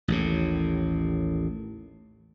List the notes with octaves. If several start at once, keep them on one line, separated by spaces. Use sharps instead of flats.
A1 D#2 A2